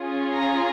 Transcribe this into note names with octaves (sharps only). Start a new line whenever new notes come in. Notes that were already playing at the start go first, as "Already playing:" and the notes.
Already playing: C#4 F4 G#4
A#5